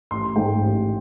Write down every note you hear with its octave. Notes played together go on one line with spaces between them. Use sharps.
A1 C6
G#2 D#3 G#3 G5
A1